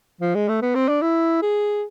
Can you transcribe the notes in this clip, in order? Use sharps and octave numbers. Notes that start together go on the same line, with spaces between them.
F3
G#3
A3
B3
C4
D4
E4
G#4